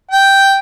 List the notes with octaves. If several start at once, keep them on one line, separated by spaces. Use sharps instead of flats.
G5